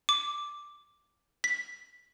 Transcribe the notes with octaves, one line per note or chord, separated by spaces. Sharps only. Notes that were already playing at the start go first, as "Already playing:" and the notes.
D6
B6